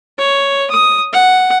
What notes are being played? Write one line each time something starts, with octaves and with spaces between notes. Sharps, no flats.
C#5
D#6
F#5